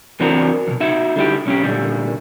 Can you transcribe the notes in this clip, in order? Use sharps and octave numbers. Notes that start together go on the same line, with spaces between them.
E2 E3 C4 D4 F#4 A#4
D#2 B2
D#4 F#4 E5
D3 G3 E4 G4
B1 C#4 G4
A#2 D3 G3